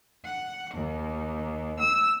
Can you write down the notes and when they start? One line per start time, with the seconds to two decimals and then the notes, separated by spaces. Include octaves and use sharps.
0.25 F#5
0.74 D#2
1.79 E6